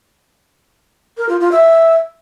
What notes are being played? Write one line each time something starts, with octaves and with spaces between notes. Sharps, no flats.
A#4
F4
F4
E5